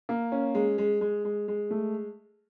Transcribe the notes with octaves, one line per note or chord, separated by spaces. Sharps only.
A#3
C#4
G#3
G#3
G#3
G#3
G#3
A3